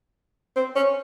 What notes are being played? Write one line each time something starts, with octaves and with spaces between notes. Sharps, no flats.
C4
C#4